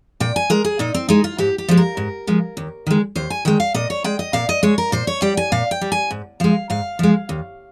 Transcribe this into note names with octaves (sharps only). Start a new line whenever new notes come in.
A#2 G5
G#5
G#3 A#4
G#4
A#2 D#4
C4
G#3 D#4
F4
G#2 G4
G4
F3 G#3 C5
A#4
G#2
F3 G#3
D#2
D#3 G#3
D#2 C5
G#5
D#3 G#3 G5
F5
A#2 D#5
C#5
G#3 G5
D#5
A#2 F5
D#5
G#3 C#5
A#4
A#2 C5
C#5
G3 G5
G#5
A#2 F5
G5
G3
G#5
G#2
F3 G#3 F5
G#2 F5
F3 G#3
D#2